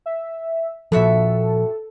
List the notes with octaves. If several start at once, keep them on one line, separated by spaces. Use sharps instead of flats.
E5
G2 A#2 F3 F#4 A4 E5